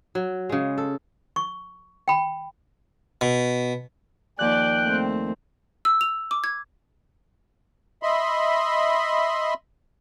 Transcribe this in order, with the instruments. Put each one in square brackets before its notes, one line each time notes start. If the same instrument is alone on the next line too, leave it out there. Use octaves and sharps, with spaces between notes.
[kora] F#3
C#3 G#3
A4
[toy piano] C#6
G5 B5
[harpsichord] B2
[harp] D#2 F3 G6 [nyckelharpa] D5 [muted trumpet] G5 [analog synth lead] F#6
[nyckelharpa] A3 C4
[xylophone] E6
F7
D6
G#6
[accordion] D#5 E5 B5 C6